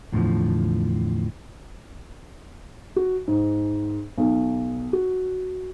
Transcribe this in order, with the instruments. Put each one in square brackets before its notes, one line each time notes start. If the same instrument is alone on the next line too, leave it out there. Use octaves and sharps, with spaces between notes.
[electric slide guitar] E2 A2 D3 D#3 F3
[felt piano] F#4
G#2
B1
F#4